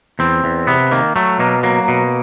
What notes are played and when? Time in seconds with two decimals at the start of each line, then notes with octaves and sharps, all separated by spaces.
0.19 E2 C4
0.44 E2
0.67 C3 B3
0.91 D#3 A#3
1.16 F#3 A3
1.39 B2 A#3
1.63 F#3 A#3
1.88 B2